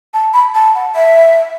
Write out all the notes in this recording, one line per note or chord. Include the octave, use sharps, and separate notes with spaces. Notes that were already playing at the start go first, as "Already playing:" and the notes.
A5
B5
A5
F#5
E5